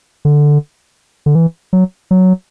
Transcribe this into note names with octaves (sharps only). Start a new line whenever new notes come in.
D3
D3
E3
F#3
F#3